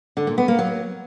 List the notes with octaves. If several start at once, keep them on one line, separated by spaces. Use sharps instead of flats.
D3
A#2
B3
A#3
F#3